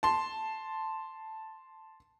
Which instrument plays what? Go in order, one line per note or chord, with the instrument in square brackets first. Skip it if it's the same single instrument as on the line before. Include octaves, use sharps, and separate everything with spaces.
[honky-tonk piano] A5 C6